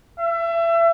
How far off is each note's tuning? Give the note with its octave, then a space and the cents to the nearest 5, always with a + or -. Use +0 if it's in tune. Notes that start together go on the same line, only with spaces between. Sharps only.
E5 +30